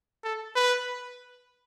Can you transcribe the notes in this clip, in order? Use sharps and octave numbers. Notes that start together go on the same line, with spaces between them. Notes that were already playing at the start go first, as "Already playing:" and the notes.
A4
B4